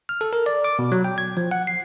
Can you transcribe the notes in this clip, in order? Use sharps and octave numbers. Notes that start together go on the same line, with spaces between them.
F6
A4
A#4
D5
D6
B2
F#3
G5
G#6
F3
F#5
C7